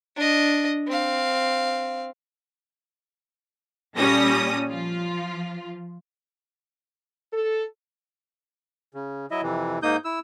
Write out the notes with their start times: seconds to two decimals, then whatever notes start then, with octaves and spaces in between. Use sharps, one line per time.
0.16 D4 D#5
0.87 C4 F5
3.97 A#2 G3 C#4 A4 D#6 A#6
4.69 F3 F4
7.33 A4
8.94 C#3
9.31 F#3 E4 D#5 E5
9.42 F2 C3 E3
9.83 G#2 A#3 D#4 D#6 G6
10.05 E4 E6